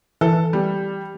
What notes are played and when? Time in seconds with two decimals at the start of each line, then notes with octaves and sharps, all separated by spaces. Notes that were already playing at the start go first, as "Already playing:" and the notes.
0.21 E3 A4
0.53 G3